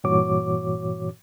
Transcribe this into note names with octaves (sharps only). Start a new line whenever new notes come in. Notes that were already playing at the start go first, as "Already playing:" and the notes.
G2 A#2 E3 F#4 C#5 D6